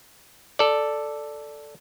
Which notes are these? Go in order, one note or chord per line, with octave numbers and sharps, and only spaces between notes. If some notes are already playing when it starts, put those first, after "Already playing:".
A4 D5